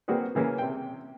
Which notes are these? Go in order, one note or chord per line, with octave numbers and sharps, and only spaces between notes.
A#3 C4 F#4 G#4 B4
C#3 E3 A#3 C#4
C3 G5